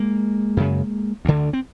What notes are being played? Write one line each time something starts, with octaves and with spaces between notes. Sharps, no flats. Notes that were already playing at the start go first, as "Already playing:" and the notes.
Already playing: G#3 A#3
F#2 C#3
D2 D3
C4